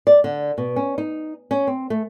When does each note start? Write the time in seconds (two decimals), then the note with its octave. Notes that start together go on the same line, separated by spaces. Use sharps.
0.07 D5
0.24 D3
0.58 B2
0.76 C#4
0.98 D#4
1.51 C#4
1.67 C4
1.90 A3